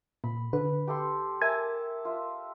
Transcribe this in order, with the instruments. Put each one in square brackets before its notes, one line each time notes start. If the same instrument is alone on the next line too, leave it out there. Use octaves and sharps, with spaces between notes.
[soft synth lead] A#2 [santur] B5
[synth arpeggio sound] D3 [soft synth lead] B4
[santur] G4 A4 C6
[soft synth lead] A#4 [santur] E5 A5 [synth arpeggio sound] G#5
[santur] F4 E5